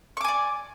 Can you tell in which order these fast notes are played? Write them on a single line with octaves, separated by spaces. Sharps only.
C#6 D6 G#5 D5